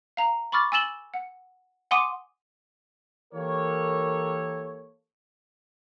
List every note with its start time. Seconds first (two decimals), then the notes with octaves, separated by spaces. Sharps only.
0.17 F5 A#5
0.52 B5 C#6 D6 F6 A6
0.72 G#5 E6 A6 E7 F#7 G7
1.14 F#5
1.91 F#5 G#5 C6 D6 D#6 D#7
3.34 E3 A#3 G4 A4 A#4 C#5